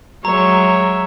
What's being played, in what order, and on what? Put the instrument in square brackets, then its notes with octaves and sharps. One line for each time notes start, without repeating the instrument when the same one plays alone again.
[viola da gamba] F#3 G#3 [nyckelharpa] C#5 E5 [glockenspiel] A#5